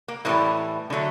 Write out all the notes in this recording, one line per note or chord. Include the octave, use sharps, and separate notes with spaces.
A#3
A2 E3 G3 A#3
D3 F#3 A3